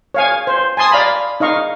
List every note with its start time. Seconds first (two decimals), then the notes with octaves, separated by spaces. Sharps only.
0.14 C#5 F5 G#5
0.47 C5
0.77 G#5 A5 C6 D#6
0.91 D5 F5 A#5 B5
1.40 D#4 D#5 F5 C#6